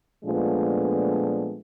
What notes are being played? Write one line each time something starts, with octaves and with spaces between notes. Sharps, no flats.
A#2 F3 G#3 A3 B3 D4